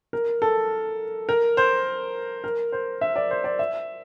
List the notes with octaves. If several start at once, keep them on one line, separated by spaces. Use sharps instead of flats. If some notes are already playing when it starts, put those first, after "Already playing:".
A#4
A4
A#4
C5
A#4
C5
E5
D5
C5
D5
E5